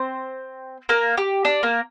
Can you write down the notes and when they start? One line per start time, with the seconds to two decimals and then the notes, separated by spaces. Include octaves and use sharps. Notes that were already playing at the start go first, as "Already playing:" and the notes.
Already playing: C4 C5
0.89 A#3 A#4
1.17 G4
1.45 D4
1.63 A#3 A#4